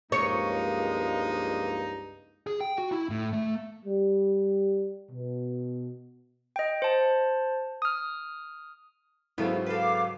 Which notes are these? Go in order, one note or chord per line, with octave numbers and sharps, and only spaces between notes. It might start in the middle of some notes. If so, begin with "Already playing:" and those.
C#2 G2 F3 G#3 A#3 D#4 C#5
G#4
G5
F#4
E4
A2
A3
G3
B2
D#5 G5
C5 A5
D#6 F6
G#2 C#3 F#3 B3 E4 F4 A4 C5
A4 B4 F5 D6